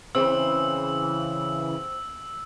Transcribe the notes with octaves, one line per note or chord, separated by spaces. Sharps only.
C#3 E3 C4 E6